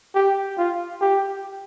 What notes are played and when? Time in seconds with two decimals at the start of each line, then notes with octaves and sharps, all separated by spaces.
0.15 G4
0.58 F4
1.01 G4